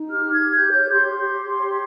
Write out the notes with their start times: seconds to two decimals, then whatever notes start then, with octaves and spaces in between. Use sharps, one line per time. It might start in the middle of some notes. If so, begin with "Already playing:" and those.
Already playing: D#4
0.09 G4 F6
0.24 G4
0.33 G#6
0.40 G4
0.55 G4 G6
0.72 C#5
0.79 G6
0.87 G4 C6
1.02 G4
1.18 G4
1.33 C#5
1.49 G4
1.64 C#5